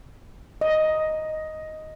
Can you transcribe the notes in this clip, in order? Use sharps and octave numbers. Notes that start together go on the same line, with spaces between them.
D#5